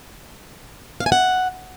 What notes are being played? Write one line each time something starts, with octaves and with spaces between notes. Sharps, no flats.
F5
G#5
F#5